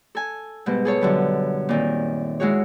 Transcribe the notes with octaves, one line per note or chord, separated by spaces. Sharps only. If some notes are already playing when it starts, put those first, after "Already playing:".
A4 G#5
G#2 B2 G3 B3
G#4 A4 C#5
F#2 D3 G3
A#2 D#3 C4
G#3 E4 F#4 G#4 C#5